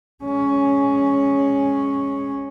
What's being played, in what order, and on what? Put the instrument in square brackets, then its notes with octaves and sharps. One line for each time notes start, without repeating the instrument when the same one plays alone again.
[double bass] G#3 C#4